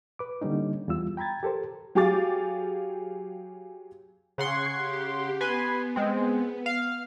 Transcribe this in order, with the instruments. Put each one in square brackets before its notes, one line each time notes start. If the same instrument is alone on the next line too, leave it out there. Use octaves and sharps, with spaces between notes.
[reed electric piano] B4 D6
D3 G3 A#3 C#4 D#4
E2 G3 F4 E6
G5 A#5 B5 G#6 A6
G4 A4 A#4 C5
[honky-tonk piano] F#3 G4 G#4 F5 D6 A6
[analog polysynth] C#3 F#5 C6 [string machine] C#6 G#6
[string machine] G4
[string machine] B3 [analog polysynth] B4 G#5 C6
[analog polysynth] G#3 C4
F5